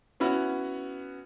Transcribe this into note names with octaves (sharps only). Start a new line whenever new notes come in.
B3 C#4 E4 F#4